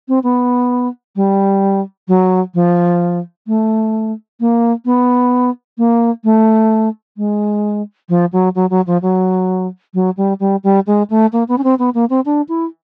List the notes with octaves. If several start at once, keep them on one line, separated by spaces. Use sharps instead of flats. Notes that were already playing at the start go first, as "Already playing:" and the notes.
C4
B3
G3
F#3
F3
A3
A#3
B3
A#3
A3
G#3
F3
F#3
F#3
F#3
F3
F#3
F#3
G3
G3
G3
G#3
A3
A#3
B3
C#4
C4
B3
A#3
C4
D4
E4